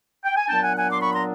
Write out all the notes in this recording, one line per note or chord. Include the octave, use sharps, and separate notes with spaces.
G5
G#5
A#2 F#3 B3 D4 G5 A5
F#5 G#5
F#5 G#5
C6 D6
B5 C#6
A#5 C6